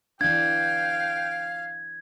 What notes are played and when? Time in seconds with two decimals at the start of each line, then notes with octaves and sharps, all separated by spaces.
0.21 E3 D4 F5 G5 G#6